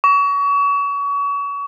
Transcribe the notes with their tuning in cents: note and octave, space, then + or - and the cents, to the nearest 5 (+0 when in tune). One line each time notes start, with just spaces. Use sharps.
C#6 +35